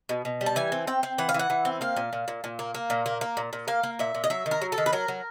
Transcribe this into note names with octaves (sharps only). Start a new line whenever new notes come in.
B2
B2
G3
A5
E3 G#5
C4
C4 G5
C4
E3 F#5
F5
E3
F#5
E3
C4
A#3 F5
A#2
A#2
A#2
A#2
A#3
A#3
A#2
A#3
A#3
A#2
A#2
A#3 F5
A#3
A#2 E5
A#2
D#5
F#3 E5
D#3
A#4
F#3
A4
D#3
B4
F#3 A#4
F#3